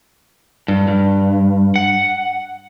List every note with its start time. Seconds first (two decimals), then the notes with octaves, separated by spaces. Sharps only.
0.68 G2
0.88 G2
1.76 F#5